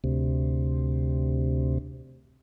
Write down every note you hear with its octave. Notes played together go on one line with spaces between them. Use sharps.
D2 C3